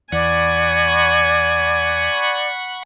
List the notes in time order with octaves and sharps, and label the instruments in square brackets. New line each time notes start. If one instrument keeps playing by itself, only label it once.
[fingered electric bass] E2 [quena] D5 [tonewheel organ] F#5 B5 C#6 [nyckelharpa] G#5